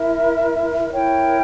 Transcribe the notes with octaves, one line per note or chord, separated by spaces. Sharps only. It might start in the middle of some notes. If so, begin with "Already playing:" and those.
Already playing: E4 A#4 E5
E4 A#4 C#5 G5